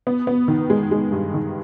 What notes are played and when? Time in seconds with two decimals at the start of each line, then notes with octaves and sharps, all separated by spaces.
0.07 B3
0.27 B3
0.48 D#3
0.70 G#3
0.91 G#3
1.12 G2
1.34 D#3